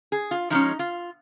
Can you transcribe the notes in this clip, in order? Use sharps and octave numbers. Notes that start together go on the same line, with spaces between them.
G#4
F4
F3 G#3 C#4 D#4
F4